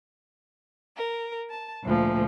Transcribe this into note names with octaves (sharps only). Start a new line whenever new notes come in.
A#4
A5
D2 A#2 F3